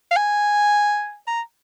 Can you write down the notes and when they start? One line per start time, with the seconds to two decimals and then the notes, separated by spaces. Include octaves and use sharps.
0.11 F5
0.17 G#5
1.27 A#5